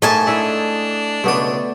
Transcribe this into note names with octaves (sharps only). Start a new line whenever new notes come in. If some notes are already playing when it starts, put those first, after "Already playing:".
G#2 A3 A#4 D#5 G#5 A5
D4 E4 A4 E5
C#2 B2 A3 B3 D5 D#6